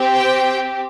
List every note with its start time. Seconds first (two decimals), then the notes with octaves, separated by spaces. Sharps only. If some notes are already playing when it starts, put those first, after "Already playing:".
Already playing: C4 G4
0.13 G5